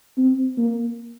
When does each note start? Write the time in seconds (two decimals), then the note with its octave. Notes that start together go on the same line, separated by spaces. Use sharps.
0.18 C4
0.57 A#3